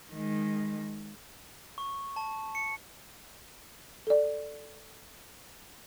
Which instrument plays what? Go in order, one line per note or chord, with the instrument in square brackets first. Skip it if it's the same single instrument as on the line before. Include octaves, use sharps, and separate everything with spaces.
[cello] D#3 G#3
[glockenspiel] C#6
A5
C#7
[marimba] A4 D5